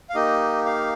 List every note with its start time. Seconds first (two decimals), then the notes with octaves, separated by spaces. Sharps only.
0.10 F5
0.15 A#3 D#4 G4 D#5
0.66 F5